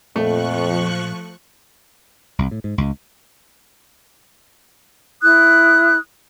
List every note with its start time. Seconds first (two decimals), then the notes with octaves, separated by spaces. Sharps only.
0.16 F2 A#2 F3 A3 C#6 F#6
2.39 C2
2.51 A2
2.64 G#2
2.78 C#2
5.21 E4 D#6 F#6